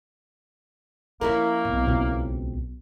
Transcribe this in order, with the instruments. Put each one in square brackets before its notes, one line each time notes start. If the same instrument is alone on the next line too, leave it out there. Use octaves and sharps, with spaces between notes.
[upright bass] F3 [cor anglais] A#3 [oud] C#4 E4 A#4
[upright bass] B1
[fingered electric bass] C#2 B2 C4